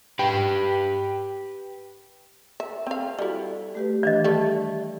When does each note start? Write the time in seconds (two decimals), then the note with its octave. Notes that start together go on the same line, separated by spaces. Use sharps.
0.19 G4 B4 G5
2.60 E5
2.87 C4 F5
3.19 G3 E4 F#4 A4
3.75 A3 G4 B4
4.03 D#3 E3 D4 D5 D#5
4.24 G3 A3 A4